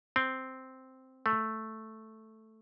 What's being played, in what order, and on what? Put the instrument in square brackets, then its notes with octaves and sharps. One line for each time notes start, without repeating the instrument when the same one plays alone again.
[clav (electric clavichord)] C4
A3